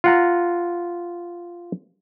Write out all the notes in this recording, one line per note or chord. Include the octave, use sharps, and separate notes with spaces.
F4 F#5 A#5